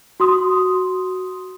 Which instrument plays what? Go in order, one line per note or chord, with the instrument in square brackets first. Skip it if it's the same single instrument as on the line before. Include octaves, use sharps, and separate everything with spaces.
[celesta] F#4 C6 D#6